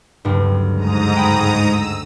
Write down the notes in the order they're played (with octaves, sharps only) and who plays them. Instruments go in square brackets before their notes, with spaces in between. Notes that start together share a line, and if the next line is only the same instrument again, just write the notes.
[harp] F#1 D2 G2
[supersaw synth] G#2 A#5 D#6
[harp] G5 B5
[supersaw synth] E6